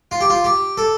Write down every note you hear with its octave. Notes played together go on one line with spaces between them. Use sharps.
F4
G4
F4
G4
A4